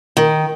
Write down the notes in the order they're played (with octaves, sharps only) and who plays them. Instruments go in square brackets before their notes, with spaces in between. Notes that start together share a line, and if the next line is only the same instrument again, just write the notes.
[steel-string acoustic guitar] D#3